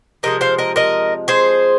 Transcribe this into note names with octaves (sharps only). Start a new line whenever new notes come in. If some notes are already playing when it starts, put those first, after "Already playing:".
C3 F3 G#3 A#4 D#5
C5 F5
A#4 D#5
A#4 D#5
G#4 C5